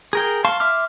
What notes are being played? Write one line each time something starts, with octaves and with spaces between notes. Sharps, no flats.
G#4 A#4 G5
F5 A5 C6 C#6
E5 C6 D6 F6